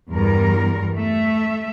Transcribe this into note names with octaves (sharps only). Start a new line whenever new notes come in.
E2 G2 G3 A#4
A3 E5